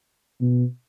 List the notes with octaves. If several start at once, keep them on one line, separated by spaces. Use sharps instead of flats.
B2